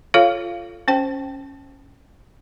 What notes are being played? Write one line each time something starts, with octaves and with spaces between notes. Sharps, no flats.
F4 A4 C#5 F5
C#4 C5 G5